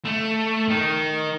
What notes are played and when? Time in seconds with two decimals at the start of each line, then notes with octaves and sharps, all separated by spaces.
0.05 A3
0.69 D#3